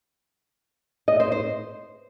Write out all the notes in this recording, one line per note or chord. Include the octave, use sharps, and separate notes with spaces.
D#5
C5
C5